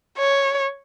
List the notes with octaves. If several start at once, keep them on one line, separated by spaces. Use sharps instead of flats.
C#5